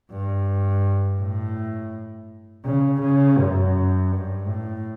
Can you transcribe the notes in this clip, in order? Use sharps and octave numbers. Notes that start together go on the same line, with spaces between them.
G2
A2
C#3
C#3
F#2
G2
A2